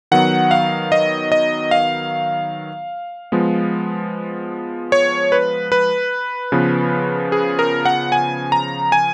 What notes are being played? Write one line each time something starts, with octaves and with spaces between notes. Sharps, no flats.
D#3 F#3 B3 F#5
F5
D#5
D#5
F5
F3 G#3 B3
C#5
B4
B4
C#3 F3 B3
G#4
A#4
F#5
G#5
A#5
G#5